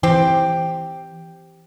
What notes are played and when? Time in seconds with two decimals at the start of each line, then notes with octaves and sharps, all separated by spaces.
0.03 E3 C4 G4